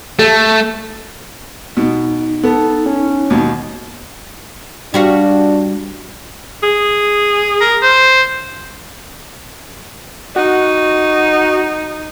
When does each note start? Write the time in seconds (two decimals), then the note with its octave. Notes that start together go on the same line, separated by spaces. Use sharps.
0.19 A3 A4
1.77 B2 D#4
2.44 B3 A4
2.86 C#4
3.30 D#2 B2
4.94 G3 D4 F#4 F5
6.63 G#4
7.61 A#4
7.82 C5
10.36 D#4 F#4